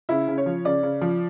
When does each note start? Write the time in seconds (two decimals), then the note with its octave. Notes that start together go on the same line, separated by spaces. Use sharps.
0.09 C#3 E4
0.28 C#3
0.38 C#5
0.46 F3
0.65 C#3 D5
0.83 C#3
1.01 F3